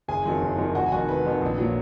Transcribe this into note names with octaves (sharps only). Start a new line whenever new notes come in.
F#1 G#4 G#5
F2 D#3 F#3
F#1
F2 D#3 F#3
F1 F#4 F#5
G#5
F2 D#3 F#4 F#5
F1 B4
F2 D#3
A#1
A#2 F#3